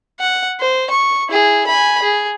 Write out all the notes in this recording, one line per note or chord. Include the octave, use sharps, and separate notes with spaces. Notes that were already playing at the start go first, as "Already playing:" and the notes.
F#5
C5
C#6
E4 G#4
G#5 B5
G#4